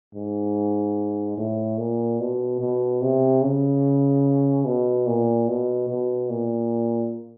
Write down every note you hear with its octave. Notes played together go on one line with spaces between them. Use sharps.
G#2
A2
A#2
B2
B2
C3
C#3
B2
A#2
B2
B2
A#2